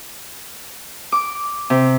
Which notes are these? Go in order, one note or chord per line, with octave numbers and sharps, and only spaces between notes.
D6
C3